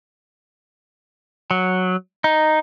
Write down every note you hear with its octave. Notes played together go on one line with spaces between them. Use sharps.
F#3
D#4